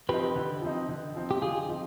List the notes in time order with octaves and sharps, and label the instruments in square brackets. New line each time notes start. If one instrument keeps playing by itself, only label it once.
[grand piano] F3 C4 D#4 [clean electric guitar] G4 B4
[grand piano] D3
F3 C4 D#4
D3
F3 C4 D#4
[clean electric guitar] G4
[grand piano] D3 [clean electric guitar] F4 G#4
[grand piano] F3 C4 D#4